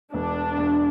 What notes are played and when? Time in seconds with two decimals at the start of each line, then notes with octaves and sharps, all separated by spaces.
0.14 E1 D4
0.58 E1